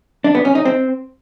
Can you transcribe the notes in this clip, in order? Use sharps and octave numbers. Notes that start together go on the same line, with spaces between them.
D4
B3
C#4
D#4
C4